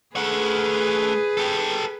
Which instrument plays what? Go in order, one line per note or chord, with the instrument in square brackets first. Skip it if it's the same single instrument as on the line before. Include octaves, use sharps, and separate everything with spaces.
[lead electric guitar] A3 F#5 [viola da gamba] G#4 B4
[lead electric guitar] G4 A4